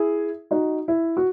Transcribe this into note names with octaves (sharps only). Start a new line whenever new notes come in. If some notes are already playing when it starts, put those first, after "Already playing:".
Already playing: E4 G#4
D#4 F#4
E4
F#4